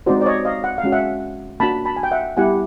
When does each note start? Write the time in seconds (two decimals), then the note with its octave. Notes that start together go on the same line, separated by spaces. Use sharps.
0.06 G#3 C4 D#4 F#4 C5 D5
0.21 D5
0.26 C#5 D#5
0.45 D#5 F5
0.64 F#5
0.78 F5
0.84 G#3 C#4 F#4
0.92 E5 F#5
1.60 A#3 D4 F#4 A5 B5
1.86 A5 B5
1.97 G#5
2.03 G5
2.11 E5 F#5
2.37 G3 B3 E4 G4 F#5 G#5